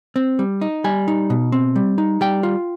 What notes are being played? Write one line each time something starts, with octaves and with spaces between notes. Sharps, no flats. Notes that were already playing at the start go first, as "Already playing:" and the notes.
C4
G3
D#4
G3 G#5
D#4
B2
C4
G3
D#4
G3 G5
F4